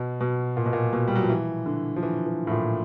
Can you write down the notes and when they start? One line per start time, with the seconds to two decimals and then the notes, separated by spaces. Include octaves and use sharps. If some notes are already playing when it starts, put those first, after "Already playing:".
Already playing: B2
0.21 B2
0.57 A#2
0.66 B2
0.73 A#2
0.93 B2
1.08 G3
1.16 F#3
1.23 F3
1.29 E3
1.66 D3
1.96 F3
2.03 E3
2.26 E3
2.47 A2
2.52 A#2